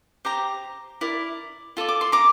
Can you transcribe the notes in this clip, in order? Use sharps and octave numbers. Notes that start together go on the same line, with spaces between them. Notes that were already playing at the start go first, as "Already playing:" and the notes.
G4 C5 A#5 D6
E4 A#4 D5
F4 A4 D5
D6
C6
A#5 D6